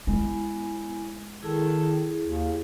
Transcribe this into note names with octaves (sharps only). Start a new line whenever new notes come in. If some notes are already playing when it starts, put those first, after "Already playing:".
G#3 B3 E4 G#5
D#3 E4 G#4 A4
D#2